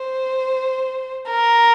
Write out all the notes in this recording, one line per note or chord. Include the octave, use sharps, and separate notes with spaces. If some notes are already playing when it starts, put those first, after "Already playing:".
Already playing: C5
A#4